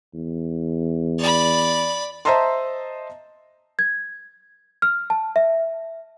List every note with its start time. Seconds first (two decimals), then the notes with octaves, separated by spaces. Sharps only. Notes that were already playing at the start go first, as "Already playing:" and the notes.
0.14 E2
1.19 D5 B5
2.25 C5 D#5 E5 A5 A#5 C6
3.79 G#6
4.82 F6
5.10 A5
5.36 E5